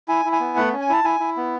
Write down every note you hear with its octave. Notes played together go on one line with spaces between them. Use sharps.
E4 G#5
E4
G#5
B3
A3 F#5
C#4
G#5
E4 A5
E4 G#5
E4
B3